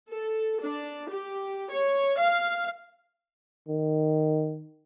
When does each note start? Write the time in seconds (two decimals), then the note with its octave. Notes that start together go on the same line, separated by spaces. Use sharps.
0.10 A4
0.61 D4
1.10 G4
1.70 C#5
2.18 F5
3.68 D#3